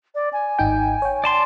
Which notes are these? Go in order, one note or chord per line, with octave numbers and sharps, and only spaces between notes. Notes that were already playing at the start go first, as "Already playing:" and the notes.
D5
G#5
G#1 D#4 G5
C#5 G5
D5 A5 C6